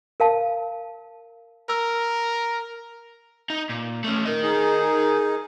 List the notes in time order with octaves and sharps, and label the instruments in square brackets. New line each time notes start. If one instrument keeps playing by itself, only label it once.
[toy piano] A#4 F5 A5
[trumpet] A#4 [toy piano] E6
[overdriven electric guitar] D#4
A#2
A3 C#4
A#4 D#5
[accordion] D#4 G#4